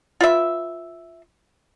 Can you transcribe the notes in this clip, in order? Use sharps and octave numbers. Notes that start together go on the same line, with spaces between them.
F4 B4 E5